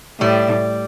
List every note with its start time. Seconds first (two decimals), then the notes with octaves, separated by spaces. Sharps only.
0.20 A2 G3